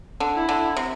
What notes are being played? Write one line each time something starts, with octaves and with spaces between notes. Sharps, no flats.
D3
E4
D3
C3